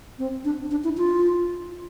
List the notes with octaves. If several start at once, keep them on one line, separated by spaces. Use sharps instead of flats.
C4
D4
D4
E4
F4